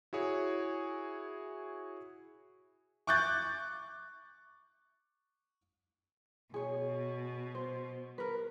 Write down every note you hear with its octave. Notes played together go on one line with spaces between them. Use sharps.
E4 F#4 G#4 C#5
C#6 D6 F#6 G6 A6
B2 G#4 C#5
C5
A#4 B4